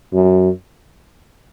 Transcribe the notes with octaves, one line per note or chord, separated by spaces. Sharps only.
F#2